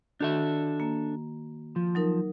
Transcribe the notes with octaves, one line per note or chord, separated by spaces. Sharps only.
D#3 D4 F#4 A4 E5
A#3
F3
F#3 D#4 A#4